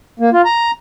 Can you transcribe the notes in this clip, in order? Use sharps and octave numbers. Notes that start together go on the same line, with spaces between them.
A#3
F4
A#5